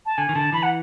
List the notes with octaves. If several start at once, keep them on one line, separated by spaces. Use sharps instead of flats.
A5
D3 G#5
D#3
D3 A5
E3 B5
F#5